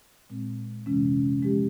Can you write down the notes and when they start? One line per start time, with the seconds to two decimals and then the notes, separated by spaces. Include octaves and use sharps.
0.30 A#2 G#3 C4
0.86 F2 C3 E3 G#3 C#4
1.42 F3 G#3 C#4 G4